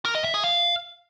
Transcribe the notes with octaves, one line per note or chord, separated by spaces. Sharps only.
A#4
D#5
E5
G#4
F5